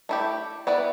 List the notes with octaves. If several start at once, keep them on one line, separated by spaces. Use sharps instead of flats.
A3 E4 G4
B3 E4 B4 D5